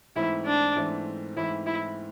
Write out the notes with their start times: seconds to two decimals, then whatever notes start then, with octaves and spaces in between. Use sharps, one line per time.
0.15 G#2 E3 A3 C4 E4
0.46 D4
0.76 G#2 E3 A3 C4
1.36 G#2 E3 A3 C4 E4
1.66 E4